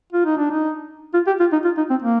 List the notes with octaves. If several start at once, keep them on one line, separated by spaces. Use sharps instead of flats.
F4
D#4
D4
D#4
F4
G4
F4
D#4
F4
D#4
C4
A#3